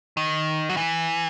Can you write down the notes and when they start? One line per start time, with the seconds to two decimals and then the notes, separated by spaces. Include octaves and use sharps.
0.17 D#3
0.69 F#3
0.77 E3